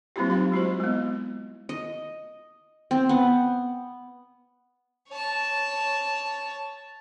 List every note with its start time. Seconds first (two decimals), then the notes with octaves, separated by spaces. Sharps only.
0.16 F#3 A#3 C4 E4 F4 G4
0.30 F#3 D#4 F5
0.52 G#3 E4 F#4 C5
0.80 G#3 B3
1.69 D#5
2.91 C4
3.09 B3
5.09 C#5 A5